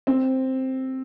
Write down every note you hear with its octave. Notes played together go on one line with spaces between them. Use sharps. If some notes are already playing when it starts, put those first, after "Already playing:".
C4